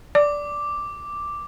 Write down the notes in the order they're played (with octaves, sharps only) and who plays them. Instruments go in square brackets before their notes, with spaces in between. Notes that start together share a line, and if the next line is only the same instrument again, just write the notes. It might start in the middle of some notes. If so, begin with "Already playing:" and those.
[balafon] D5 [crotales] D6